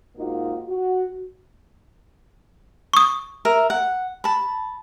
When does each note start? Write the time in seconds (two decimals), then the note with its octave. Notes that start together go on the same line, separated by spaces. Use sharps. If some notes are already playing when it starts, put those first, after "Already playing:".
0.16 G#2 A#3 D#4 F4 F#4
0.67 F#4
2.93 C#6 D#6
3.45 A#4 E5
3.70 F#5
4.24 A5 B5